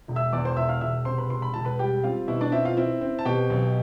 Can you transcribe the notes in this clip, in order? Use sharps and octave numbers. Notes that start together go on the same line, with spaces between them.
E1
E5 E6
E2 D5 D6
C5 C6
E1 E5 E6
F5 F6
E1 E5 E6
C3 C5 C6
B4 B5
E1 C6
B5
E1 A5
B4 B5
G3 G4 G5
C4 F4 F5
B2 E4 E5
D4 D5
C4 E4 E5
F4 F5
C4 E4 E5
C4
A5
B2 G4 G5
B1